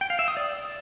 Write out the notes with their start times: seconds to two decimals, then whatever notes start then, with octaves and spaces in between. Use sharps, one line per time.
0.01 G5
0.10 F5
0.19 E5
0.28 D#6
0.37 D5